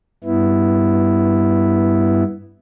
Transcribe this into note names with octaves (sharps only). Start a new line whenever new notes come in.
G2 B3 E4